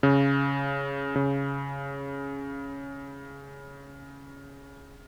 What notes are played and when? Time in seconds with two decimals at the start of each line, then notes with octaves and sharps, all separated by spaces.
0.03 C#3
1.16 C#3